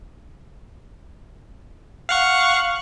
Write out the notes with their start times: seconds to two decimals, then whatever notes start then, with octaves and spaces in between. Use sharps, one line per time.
2.09 F5 F#5 C#6